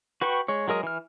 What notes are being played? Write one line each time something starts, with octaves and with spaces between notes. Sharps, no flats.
F#4 B4 G5 C#6
G#3 C#5
F#3 G#3 A#4 D#5
E3 F6